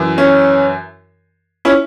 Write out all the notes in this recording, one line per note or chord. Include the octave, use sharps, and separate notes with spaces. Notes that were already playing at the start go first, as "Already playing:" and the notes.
Already playing: F#2 E3
C#4
C#4 E4